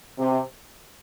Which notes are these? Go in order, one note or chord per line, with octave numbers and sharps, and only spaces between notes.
C3